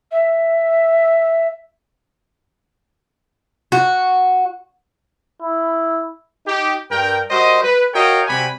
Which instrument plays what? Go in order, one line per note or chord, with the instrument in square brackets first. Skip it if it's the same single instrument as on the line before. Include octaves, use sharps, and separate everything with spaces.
[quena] E5
[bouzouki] F#4
[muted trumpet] E4
[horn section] D#4 G4
G2 A#4 G5
G3 F#4 A#4 C5 D#5
B4
F#4 A#4 C#5 D#5 F5 G5
C3 G3 F#4 G4 G#5 B5